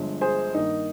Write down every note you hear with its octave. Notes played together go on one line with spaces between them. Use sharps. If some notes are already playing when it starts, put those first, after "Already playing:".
Already playing: G1 G2 F3 G#3
G#4 C5
G2 D#3 A#3 D#4